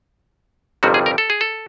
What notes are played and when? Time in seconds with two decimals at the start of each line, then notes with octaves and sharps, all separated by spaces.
0.83 G1 F2 C3 D#3 G3 F#4
0.94 G#4
1.06 A#4
1.18 A4
1.30 G#4
1.41 A4